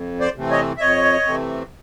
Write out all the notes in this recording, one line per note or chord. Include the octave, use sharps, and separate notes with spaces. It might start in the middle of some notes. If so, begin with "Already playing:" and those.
Already playing: F2
C5 D5
C3 E3 A3 C4
C#5 D#5
E5
F2 C#5 D#5
C3 E3 A3 C4